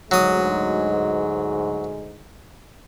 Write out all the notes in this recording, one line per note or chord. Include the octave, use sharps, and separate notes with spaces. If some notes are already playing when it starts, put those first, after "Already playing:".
D2 G#2 F#3 G#3 D#6